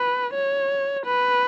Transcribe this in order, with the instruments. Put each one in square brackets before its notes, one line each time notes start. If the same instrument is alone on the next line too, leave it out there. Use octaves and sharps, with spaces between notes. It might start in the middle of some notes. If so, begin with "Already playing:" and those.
Already playing: [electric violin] B4
C#5
B4